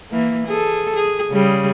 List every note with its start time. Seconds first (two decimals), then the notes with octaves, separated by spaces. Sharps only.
0.11 E3 A#3
0.47 G#4 A4
0.96 G#4
1.31 C#3 G3 G#4